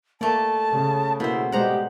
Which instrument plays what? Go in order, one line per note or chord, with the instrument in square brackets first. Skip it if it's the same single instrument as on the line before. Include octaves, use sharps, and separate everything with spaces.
[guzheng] A3 D5 [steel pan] A#3 [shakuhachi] A5
[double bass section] C#3
[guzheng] B2 C5 [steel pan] A#3 [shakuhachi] E4
[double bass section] B2 [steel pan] G3 G#3 C5 [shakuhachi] G4 [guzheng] F#5 A#5